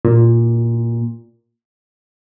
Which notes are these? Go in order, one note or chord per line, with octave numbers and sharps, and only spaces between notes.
A#2